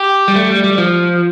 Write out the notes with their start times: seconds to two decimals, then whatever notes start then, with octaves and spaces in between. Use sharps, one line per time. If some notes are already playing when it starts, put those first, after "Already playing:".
Already playing: G4
0.28 G3
0.36 A3
0.51 G3
0.64 G3
0.78 F3